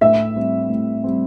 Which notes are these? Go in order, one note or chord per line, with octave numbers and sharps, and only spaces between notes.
A2 E5
G3 C4
A2
G3 C4